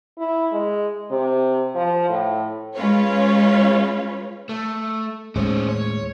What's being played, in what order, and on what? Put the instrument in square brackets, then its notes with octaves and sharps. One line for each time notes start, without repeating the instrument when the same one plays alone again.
[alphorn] E4
G#3
C3
F3
A2
[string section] G#3 C#4 F4 B4 C#5
[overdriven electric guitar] A3
[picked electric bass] D#2 A2 G#3 [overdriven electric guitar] C#4 C5
[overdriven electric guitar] C#5